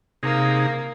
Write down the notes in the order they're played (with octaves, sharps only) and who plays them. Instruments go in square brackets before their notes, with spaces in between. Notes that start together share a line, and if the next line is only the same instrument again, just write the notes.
[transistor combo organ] C3 D#4 G#4 [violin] A#3